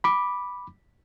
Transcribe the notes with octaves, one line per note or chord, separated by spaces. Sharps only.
B5 D6